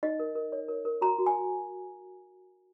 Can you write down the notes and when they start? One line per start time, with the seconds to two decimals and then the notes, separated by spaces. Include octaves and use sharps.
0.03 D#4 D#5
0.19 A#4
0.35 A#4
0.52 C#5
0.68 A#4
0.85 A#4
1.01 F#4 A#5
1.18 F#4
1.26 G#5